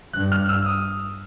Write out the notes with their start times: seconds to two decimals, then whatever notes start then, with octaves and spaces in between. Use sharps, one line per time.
0.13 G2 F#6
0.32 F6
0.49 E6
0.66 D#6